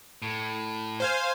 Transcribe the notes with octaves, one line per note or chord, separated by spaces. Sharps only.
A2
C5 F5 G#5